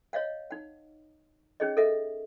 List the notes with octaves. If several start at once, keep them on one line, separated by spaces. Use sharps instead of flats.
C#5 D#5 F5 F#5
D#4 F#5
C#4 D#4 G#4 C#5 D#5
A4 A#4 D#5 E5 F#5